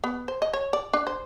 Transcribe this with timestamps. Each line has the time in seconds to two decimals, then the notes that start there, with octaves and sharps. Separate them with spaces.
0.04 B3
0.28 C5
0.42 D#5
0.53 C#5
0.73 D5
0.93 D4
1.07 C5